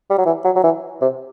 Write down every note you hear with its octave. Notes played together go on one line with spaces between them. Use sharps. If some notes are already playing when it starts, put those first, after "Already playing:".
G3
F#3
E3
F#3
F#3
E3
C3